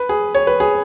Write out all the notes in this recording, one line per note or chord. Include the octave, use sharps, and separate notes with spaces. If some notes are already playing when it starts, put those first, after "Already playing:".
Already playing: B4
G#4
C#5
B4
G#4